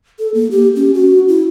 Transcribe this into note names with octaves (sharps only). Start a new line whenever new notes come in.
A4
A#3
G4
C#4
F#4
E4